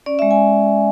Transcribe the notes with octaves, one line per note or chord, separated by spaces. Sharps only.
C#4 D5
E5
G#3
G#5